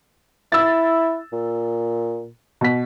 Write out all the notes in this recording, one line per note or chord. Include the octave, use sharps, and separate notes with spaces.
E4 E6 A6
A#2
B2 B6